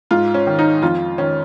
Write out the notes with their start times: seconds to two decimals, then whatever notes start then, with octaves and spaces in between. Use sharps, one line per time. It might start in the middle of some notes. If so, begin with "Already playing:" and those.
0.11 G#2 F4
0.34 C#4
0.47 D#3
0.59 D#4
0.82 F2 F4
1.18 D#3 C#4